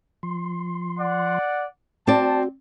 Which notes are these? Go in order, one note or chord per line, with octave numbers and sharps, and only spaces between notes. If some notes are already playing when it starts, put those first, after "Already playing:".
F3 C6
D5 F#5
C4 F#4 D5 A5